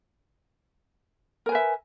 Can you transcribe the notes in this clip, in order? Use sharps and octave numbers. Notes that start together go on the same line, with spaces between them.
A#4 B4 E5 G#5